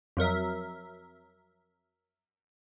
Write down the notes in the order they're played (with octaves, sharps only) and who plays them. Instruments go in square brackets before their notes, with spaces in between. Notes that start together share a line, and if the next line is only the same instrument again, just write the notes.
[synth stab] F2 F#3 A#4 E5